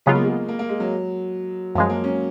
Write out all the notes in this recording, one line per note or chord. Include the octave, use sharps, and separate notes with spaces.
C#3 F#3 G#3 B3 F4
A#3
G#3
A#3
A#3
G#3
F#3
F#2 F3 F#3 G#3
A#3
C#4